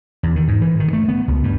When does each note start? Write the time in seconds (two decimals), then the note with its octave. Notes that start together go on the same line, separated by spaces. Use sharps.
0.23 E2
0.36 D#3
0.48 G#2
0.61 E3
0.80 D#3
0.93 A3
1.08 B3
1.28 C#2
1.43 G2